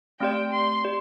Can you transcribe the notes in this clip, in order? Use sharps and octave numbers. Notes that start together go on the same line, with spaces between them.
A3 C4 G4 D5 G5
C6
G4 D5